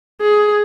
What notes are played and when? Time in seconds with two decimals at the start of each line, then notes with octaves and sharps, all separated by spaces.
0.21 G#4